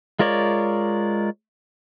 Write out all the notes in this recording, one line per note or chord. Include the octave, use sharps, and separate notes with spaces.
G#3 F4 A#4 C#5 D5